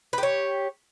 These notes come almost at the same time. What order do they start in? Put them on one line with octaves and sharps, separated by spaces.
B4 G4 C#5